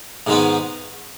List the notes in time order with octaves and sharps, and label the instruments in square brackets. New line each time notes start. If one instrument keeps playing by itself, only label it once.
[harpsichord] G#2 D#3 G#3 B3